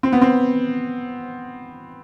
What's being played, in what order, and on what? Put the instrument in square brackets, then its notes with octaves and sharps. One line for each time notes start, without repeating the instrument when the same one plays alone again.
[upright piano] C4
B3
C4